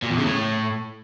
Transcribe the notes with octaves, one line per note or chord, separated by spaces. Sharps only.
A#2
E2
C#3
A2